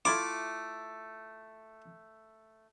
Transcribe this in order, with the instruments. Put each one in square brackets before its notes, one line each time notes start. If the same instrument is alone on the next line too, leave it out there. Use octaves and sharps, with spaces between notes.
[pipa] A3 E4 F4 [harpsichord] D6